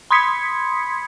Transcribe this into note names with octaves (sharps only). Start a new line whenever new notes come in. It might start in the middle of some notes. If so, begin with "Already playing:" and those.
B5 C6 D#6 G#6 B6 C#7